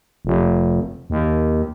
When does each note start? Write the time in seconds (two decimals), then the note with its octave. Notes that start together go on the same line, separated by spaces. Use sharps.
0.25 F1
1.10 D#2